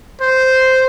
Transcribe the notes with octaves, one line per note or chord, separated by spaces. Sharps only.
C5